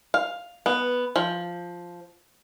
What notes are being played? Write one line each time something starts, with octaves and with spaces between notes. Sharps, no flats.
F5
B3
F3